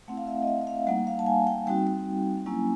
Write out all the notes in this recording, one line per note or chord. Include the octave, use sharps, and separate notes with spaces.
A3 C4 E4 F#5
F5
E5
D#5
E5
E5
F5
G3 A#3 D#4 F#5
F5
A5
G#5
G5
G3 C4 D#4 F#4 G5
G5
F#3 A#3 C#4 E4 G#5